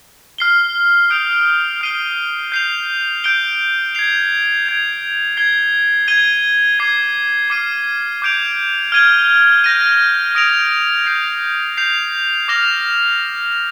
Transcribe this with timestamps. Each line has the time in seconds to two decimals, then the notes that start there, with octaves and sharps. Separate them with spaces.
0.38 F6 C7 G7
1.10 D#6 G6 D7 F7
1.81 F6 C7 D#7 G7
2.52 G6 C7 F7
3.24 G6 D7 G7
3.95 G#6 C7 F7
4.66 G#6 D7 F7
5.37 G#6 C7 G7
6.08 G#6 D#7 G7
6.79 D6 G#6 C7
7.50 D6 F6 C7 D#7
8.22 D6 G6 D7 F7
8.92 F6 G#6 D#7 G7
9.64 G6 A#6 D#7
10.35 D#6 A#6 D7 F7
11.06 G6 C7 F7
11.77 G6 C7 F7
12.48 D6 F6 A#6 F7